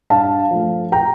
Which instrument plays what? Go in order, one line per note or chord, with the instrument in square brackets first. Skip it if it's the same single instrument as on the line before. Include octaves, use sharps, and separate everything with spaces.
[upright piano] G2 F5 A5
F3 A3
G5 A#5